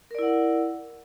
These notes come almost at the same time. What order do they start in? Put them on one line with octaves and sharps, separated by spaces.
A#4 D5 E4 F#5